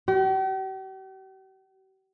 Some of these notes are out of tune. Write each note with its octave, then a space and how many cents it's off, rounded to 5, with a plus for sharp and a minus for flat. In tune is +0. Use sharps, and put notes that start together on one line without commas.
G4 -45